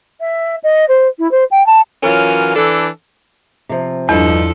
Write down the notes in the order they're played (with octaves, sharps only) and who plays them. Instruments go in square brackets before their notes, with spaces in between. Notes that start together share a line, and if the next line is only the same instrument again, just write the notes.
[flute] E5
D#5
C5
E4
C5
G5
A5
[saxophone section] E3 F#3 C#4 F4 A#4
E3 D4 A4
[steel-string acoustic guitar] C3 F3
[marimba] E2 [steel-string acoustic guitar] G2 D#4 [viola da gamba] F3 D4 A4